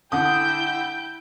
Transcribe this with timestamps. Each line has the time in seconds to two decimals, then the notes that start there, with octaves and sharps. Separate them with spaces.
0.12 D3 E4 G5 D#6 G6